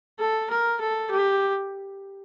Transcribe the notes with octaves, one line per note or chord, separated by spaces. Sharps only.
A4
A#4
A4
G4